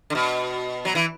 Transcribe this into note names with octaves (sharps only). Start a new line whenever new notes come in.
D3
B2
F#3
E3